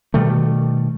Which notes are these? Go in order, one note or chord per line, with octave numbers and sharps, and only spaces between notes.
B2 D#3 G3 A3